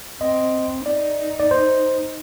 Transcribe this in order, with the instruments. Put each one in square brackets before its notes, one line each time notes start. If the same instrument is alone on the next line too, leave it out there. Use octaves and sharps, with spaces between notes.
[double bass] C4 [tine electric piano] D#5
[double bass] D#4 [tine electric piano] D5
[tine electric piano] D5
C5